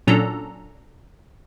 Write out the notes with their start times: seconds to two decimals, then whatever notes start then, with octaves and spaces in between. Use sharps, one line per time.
0.07 A#2 F#3 C#4 D4 A4 A#5